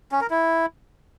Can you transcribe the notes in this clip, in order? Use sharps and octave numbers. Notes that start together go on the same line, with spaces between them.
C#4
A#4
E4